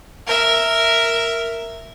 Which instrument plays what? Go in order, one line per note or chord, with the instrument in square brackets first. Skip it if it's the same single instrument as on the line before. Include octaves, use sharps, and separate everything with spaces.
[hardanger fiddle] A#4 E5